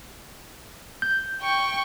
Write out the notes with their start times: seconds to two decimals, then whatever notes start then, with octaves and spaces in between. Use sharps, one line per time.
1.02 G6
1.42 G5 C#6